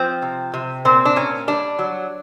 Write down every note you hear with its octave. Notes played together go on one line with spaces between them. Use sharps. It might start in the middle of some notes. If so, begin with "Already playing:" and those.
Already playing: F3 C4
C3
C3
A#2 C4
D4
A#2 C#4
G3 D4
F#3